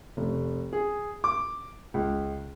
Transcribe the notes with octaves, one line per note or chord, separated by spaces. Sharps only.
F1
G#4
D6
C#2